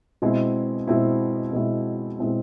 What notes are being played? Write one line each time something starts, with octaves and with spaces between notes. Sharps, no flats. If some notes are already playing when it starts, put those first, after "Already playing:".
B2 G#3 C4 E4
B2 G#3 C4 E4
B2 G#3 C4 E4
B2 G#3 C4 E4